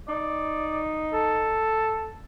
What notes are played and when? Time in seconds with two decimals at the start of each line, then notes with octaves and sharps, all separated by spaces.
0.08 D#4 D5
1.13 A4